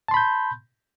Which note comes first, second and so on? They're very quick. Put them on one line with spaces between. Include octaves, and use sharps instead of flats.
A5 C6 B5 G6